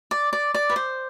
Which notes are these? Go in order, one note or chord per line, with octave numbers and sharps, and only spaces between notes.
D5
D5
D5
B4
C5